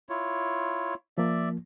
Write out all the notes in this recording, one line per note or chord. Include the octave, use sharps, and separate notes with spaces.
E4 F4 C#5
F3 A#3 D5 E5